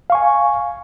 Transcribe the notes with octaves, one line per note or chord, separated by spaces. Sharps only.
F5 G#5 C#6